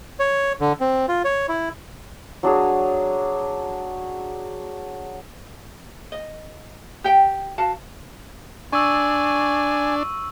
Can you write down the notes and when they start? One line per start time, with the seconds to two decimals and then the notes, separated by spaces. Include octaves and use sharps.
0.19 C#5
0.60 D3
0.80 C4
1.08 F4
1.24 C#5
1.49 E4
2.43 F#3 D4 F#4 G#4
6.12 D#5
7.04 G4 G5
7.58 F#4 F5 A5
8.73 D4 G#5 C#6 E6